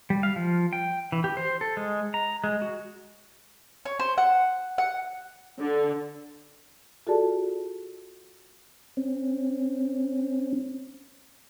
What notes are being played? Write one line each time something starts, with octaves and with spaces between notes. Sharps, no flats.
G3
F5
F3
G5
E3
G4
C5
A4
G#3
A#5
G#3
F#4
C#5
C5
F#5
F#5
D3
F4 F#4 G#4 A4 D5 A5
C4 C#4